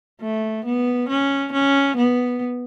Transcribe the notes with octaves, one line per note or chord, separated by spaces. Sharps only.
A3
B3
C#4
C#4
B3